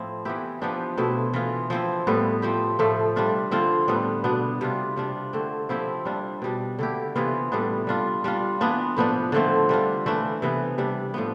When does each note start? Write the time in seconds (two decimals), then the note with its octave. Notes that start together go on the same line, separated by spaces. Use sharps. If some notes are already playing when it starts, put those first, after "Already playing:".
Already playing: A2 F3 C4 E4
0.25 E3 B3 E4 G4
0.61 F3 B3 D4 G4
0.97 B2 A3 C4 E4
1.34 E3 B3 F4
1.70 F3 C4 E4
2.07 A2 G3 B3
2.42 F3 C4 G4
2.79 A2 F3 A3
3.16 G3 D4 F4
3.51 D3 F3 C4 F4
3.88 A2 G3 B3 D4
4.24 B2 B3 D4
4.61 C3 G3 D4 F4
4.96 C3 G3 D4 F4
5.33 D3 A3 C4
5.69 F3 C4 E4 G4
6.05 G3 D4 F4
6.42 B2 G3 D4
6.79 D3 A3 E4 G4
7.16 C3 E3 B3 F4
7.52 A2 G3 B3 D4
7.87 G3 D4 F4
8.24 G3 D4 F4
8.61 E3 B3 D4 F4
8.97 A2 F3 B3 D4
9.32 D3 F3 A3 C4
9.69 G3 D4 F4
10.06 E3 A3 D4
10.42 C3 E3 B3
10.78 C3 G3 D4
11.14 A2 F3 B3